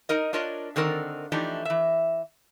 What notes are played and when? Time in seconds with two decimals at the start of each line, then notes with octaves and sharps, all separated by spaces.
0.09 D#4 A#4 D#5
0.33 D4 F4 A#4 C#5 D#5
0.76 D3 D#3 C4 A#4
1.32 E3 F3 A3 D4 D#4 G4
1.65 E3 E5